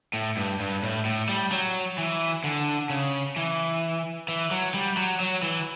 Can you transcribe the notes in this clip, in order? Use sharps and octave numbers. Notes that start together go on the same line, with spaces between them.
A2
G2
G2
A2
A2
G3
F#3
E3
D3
C#3
E3
E3
F#3
G3
F#3
F#3
E3